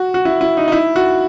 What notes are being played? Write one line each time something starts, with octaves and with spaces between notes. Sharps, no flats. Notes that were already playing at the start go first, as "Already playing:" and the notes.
Already playing: F#4
F#4
E4
E4
D#4
D#4
E4
F#4